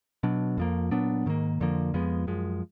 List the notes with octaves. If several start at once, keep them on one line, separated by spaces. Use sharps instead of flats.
B2 F#3 D4
F2 F3 A#3
A#2 F#3 B3 D4
G#2 D#3 A#3
F2 D3 F3 A#3
F2 F3 G#3 B3
F#2 F3 G#3